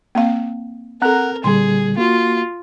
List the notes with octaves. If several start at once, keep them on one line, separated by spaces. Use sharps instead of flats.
A#3 C4 F5
C4 A4 A#4 F#5 A#5 F#6
A#2 D3 G3 G#4 C6
A#3 F4 F#4